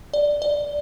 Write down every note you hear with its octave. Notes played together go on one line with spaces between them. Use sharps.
D5
D5